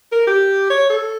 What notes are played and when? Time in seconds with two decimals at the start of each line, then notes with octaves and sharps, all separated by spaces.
0.12 A#4
0.27 G4
0.70 C#5
0.90 A4